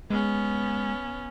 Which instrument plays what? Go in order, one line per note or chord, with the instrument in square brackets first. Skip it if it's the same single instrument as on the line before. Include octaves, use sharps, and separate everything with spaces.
[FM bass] G#3 [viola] B3 C#4